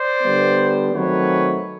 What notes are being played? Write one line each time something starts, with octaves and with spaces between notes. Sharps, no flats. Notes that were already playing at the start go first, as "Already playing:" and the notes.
Already playing: C5 D5
D3 G3 B3
D#3 F#3 A3 C4 B4 C#5